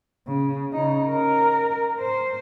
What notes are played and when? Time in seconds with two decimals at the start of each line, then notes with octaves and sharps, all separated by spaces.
0.27 C#3
0.73 C#3 D#4
1.10 A#4
2.00 C5